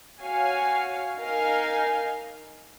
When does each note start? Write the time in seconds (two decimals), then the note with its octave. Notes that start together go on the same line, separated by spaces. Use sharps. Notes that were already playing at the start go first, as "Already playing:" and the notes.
0.21 F#4 C#5 F5 G#5
1.19 D#4 A#4 F5 G#5